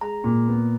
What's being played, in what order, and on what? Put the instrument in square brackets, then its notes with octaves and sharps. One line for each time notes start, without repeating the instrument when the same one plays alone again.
[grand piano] G#3 [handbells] A#5
[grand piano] A#2
B3